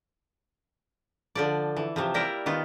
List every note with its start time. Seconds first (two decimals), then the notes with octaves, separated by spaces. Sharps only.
1.35 D3 F3 D5
1.76 E3
1.96 C3 E3 F3
2.14 G3 A#3 E4 A#4 G5
2.46 D#3 B3 F4